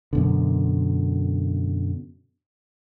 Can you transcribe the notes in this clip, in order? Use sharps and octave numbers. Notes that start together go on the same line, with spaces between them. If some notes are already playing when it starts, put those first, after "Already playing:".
F#2 B2 D3